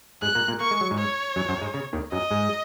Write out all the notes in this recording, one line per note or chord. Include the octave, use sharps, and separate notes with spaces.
G#2 G#3 F#6
A#2 A#3
A#2 A#3
A#3 C#6
G#3
F#3
G#2 G#3
C#5
F#2 F#3
F#2 F#3
G#2 G#3
C#3
D#2 D#3
F#2 F#3 D#5
G#2 G#3